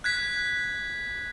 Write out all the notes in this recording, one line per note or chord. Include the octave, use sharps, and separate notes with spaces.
F#6 G#6 B6